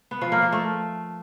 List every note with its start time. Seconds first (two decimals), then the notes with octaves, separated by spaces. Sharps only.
0.11 B3
0.21 F3
0.32 A#3
0.42 F3
0.53 A3